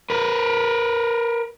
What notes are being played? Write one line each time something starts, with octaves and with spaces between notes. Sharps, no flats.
A#4 B4